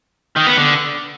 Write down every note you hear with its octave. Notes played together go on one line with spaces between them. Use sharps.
D#3
B3
D3